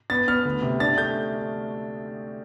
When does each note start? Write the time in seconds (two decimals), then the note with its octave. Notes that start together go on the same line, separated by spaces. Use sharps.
0.10 B3 A6
0.28 B3 F6
0.45 D2
0.62 C3
0.80 D4 A6
0.98 A3 G6